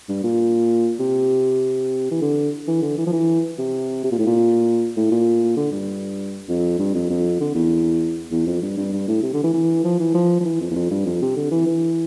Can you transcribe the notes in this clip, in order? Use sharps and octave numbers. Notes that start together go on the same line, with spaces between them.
G2
A#2
C3
E3
D3
E3
D3
E3
F3
E3
C3
C3
A#2
A2
A#2
A2
A#2
D3
G2
F2
G2
F2
F2
D3
E2
E2
F2
G2
G2
G2
A2
C3
D3
E3
E3
F3
E3
F3
F3
E3
F2
E2
F2
G2
F2
C3
D3
E3
E3